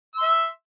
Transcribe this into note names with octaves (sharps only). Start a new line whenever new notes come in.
E5 C6 E6